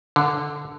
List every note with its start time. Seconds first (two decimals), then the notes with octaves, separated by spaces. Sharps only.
0.16 D3